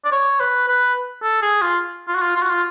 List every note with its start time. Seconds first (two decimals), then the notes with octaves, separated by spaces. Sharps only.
0.04 D5
0.12 C#5
0.40 B4
0.68 B4
1.23 A4
1.42 G#4
1.61 F4
2.08 F4
2.15 F#4
2.22 F4
2.36 F4
2.42 F#4
2.50 F4